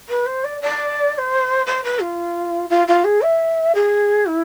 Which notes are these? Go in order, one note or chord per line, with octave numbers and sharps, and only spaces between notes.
B4
C5
D5
D5
D5
C5
C5
B4
F4
F4
F4
G#4
E5
G#4
E4